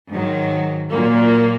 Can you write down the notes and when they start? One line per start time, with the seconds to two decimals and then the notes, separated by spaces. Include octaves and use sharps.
0.11 G#2 D#3 F#3
0.90 A#2 F#3 A#3